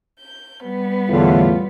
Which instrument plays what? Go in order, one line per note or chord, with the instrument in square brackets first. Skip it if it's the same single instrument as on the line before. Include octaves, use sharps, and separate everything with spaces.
[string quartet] G6
G3 B3
[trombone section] E2 A2 [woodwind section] D3 [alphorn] F4